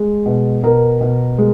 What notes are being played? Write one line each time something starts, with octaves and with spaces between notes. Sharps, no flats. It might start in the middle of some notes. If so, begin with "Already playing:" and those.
Already playing: G#3
B2
B2 A#4
B2
G#3